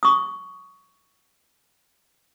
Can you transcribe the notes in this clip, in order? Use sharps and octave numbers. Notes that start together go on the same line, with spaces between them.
C#6 D#6